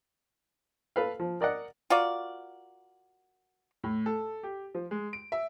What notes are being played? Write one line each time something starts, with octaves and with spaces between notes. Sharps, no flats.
A4 B4 F5
F3
A#4 D5 D#5 F#5
F4 F#4 A#4 D5
A2
A4
G4
F3
G#3
D7
E5